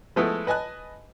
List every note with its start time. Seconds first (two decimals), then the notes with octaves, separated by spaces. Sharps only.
0.16 F3 G#3 A3 B3 E4 A4
0.47 B4 D#5 G#5 A5 F#6